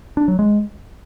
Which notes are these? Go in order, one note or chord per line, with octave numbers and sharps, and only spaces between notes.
D4
F#3
G#3